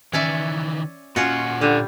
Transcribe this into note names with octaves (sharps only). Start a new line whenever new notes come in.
D#3 E3 C#4 D5 E5
A#2 C#4 F4 F#4 F#5
D3 G3